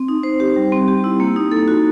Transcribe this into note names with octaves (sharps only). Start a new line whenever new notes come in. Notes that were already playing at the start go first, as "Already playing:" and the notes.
Already playing: C4
D#4
C5
G4
G3
C4
G4
E4
A#3
D#4
A4
F#4